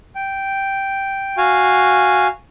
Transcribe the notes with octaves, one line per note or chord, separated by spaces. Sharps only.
G5
F#4 F5 G#5